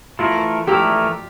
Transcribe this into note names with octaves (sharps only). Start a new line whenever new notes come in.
E3 A3 E4 F4 A#4
E3 A3 E4 G4 A#4